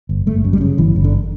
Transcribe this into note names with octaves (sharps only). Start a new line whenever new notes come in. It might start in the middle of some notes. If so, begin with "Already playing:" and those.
G1
G1 A3
F#2
G3
C#3
G1 E3
G1
D3